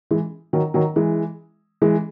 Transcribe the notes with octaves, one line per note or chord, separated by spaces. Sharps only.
E3 G#3
D#3 F#3
D#3 F#3
E3 G#3
E3 G#3